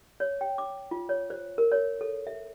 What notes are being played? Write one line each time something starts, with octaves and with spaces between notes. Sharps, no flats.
C#5
G5
D6
F4
C#5
C5
A#4
C#5
A4
E5